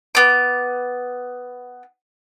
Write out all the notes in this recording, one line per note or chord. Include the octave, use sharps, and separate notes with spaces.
B3 D6